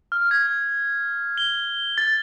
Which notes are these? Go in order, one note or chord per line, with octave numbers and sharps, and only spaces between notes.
F6
G#6
G7
A6